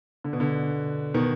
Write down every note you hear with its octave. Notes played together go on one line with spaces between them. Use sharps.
D3
B2
D3
B2 D#3